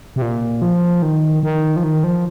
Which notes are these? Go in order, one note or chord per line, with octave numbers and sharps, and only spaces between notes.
C3
A#2
F3
D#3
D#3
F3
D#3
F3